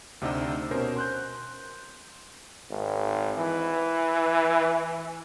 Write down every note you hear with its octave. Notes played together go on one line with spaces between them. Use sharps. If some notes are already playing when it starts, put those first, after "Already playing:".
D2 C3 D4 D#4 D#5 E6
B2 C#4 A#4 C5
C6 F#6 G6
G#1
E3